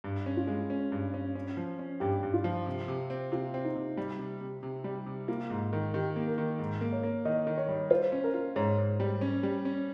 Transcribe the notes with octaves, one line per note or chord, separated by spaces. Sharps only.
G2
C#4
F4
G#3
C#4
G2
C#4
C#4
F3
C#4
G2 G4
G2
F4
F3
C3
C3
C4
C3 F4
C4
D#4
C3
G3
C3
C3
C3
G3
C3
A#3 F4
G#2
D#3
D#3 G4
A#3
A#4
D#3
G#2
A#3
C#5
A#3
D#3 D#5
D#3
C#5
G3
F4 C5
C#4
A#4
F4
G#2 C#5
G#2
G3
C#4
G3
C#4